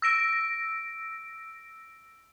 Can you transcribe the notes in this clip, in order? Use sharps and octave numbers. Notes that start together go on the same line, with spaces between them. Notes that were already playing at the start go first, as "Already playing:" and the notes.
E6 A#6 D7